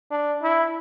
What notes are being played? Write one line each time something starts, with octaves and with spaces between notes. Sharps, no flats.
D4
E4